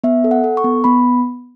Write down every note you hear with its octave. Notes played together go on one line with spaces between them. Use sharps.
B3 E5
A4
F#5
A4
C#6
B3
B3 B5